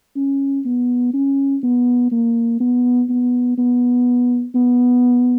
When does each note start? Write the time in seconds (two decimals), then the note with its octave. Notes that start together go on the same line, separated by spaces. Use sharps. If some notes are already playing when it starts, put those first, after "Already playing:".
0.16 C#4
0.65 B3
1.14 C#4
1.63 B3
2.12 A#3
2.60 B3
3.10 B3
3.58 B3
4.55 B3